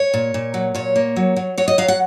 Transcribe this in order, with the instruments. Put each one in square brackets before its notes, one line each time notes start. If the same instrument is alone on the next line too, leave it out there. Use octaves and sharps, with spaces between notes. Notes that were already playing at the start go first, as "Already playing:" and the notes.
Already playing: [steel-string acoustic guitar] C#5
A#2
A#2
F#3
A#2 C#5
A#3
F#3
F#3
F#3 C#5
D#5
F#3 F5
F#5